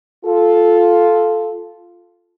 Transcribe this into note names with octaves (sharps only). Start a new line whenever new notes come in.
F4 A4